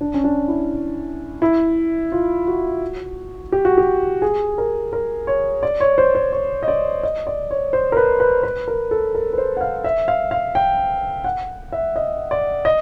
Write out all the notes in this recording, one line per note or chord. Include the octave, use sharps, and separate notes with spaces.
D4
C#4
D4
E4
E4
F4
F#4
G4
F#4
G4
G#4
A#4
A#4
C#5
D5
C#5
C5
C5
C#5
D#5
D5
D#5
D5
C#5
C5
A#4
B4
B4
B4
A#4
A4
A#4
B4
C5
F#5
F5
E5
F5
F5
G5
F#5
E5
D#5
D5
D#5